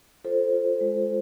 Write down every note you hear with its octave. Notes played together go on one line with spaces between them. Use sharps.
F4 A4 C5
F4
G#3